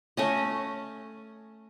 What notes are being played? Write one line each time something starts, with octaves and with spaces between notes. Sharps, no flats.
A3 C#4 D#5